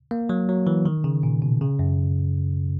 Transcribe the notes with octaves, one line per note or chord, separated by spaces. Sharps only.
A#3
F#3
F#3
E3
D#3
C#3
A#2
B2
C#3
F#2